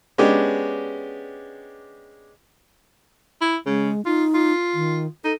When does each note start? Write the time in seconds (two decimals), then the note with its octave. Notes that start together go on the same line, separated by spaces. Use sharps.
0.18 G#3 B3 C#4 D4 G4
3.41 E4
3.66 C#3 G#3
4.06 D#4 F4
4.34 F4
4.74 D#3
5.24 D#4 A4